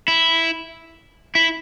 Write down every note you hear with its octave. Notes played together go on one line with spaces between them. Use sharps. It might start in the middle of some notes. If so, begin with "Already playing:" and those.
E4
E4